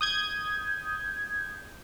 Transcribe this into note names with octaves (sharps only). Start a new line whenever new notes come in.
D#6 G6 G#6